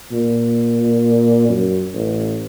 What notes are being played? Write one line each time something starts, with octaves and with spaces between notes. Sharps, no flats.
A#2
F#2
A1